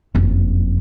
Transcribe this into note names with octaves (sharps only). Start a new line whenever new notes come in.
F#1 F2